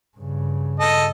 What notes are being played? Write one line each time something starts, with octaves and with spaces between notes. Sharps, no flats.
G2 C#3
A4 D#5